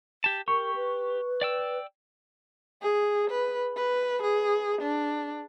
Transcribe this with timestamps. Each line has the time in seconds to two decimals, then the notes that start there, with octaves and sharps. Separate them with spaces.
0.24 G4 A5
0.48 G4 A#4 C#6
0.75 B4
1.41 D5 G5 E6
2.83 G#4
3.31 B4
3.77 B4
4.23 G#4
4.82 D4